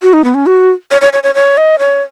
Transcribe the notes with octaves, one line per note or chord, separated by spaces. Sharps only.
F#4
D#4
B3
C#4
F#4
C#5
C#5
C#5
C#5
C#5
D#5
C#5